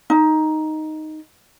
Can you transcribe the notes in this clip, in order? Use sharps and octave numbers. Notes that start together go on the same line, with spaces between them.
D#4